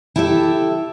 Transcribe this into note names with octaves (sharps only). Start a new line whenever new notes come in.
E4 G4 A4 C#5 E5